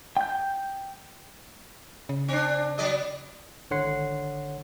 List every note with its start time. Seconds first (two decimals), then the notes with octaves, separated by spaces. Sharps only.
0.17 G5 G6
2.09 C#3
2.28 C4 D4
2.78 F#3 D5 D#5
3.71 G#1 D3 C#5 F#5 C6 C7